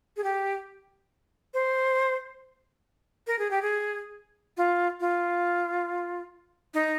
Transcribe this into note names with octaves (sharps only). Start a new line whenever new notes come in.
G#4
G4
C5
A#4
G#4
G4
G#4
F4
F4
D#4